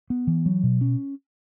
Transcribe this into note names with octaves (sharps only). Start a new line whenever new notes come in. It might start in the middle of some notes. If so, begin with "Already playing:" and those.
B3
E3
F#3
B2
C#4